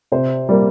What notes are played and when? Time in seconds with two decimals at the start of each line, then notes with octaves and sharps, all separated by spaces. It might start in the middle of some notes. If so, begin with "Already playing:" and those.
0.12 C3 C5
0.49 G3 A#3